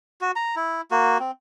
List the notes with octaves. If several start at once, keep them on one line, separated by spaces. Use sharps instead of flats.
F#4
A#5
E4
A#3 F#4
C4